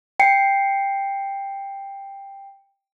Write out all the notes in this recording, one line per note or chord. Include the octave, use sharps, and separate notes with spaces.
G5 C7 C#7